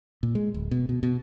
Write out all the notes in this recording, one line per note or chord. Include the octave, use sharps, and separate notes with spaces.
A#2
G#3
D1
B2
B2
B2